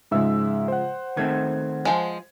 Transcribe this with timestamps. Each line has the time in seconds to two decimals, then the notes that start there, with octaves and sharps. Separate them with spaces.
0.11 G#2 C#3 F3 G#3 E5 E6
0.68 C5 F#5
1.17 D#3 A3 C4 G#6
1.85 F3 G#3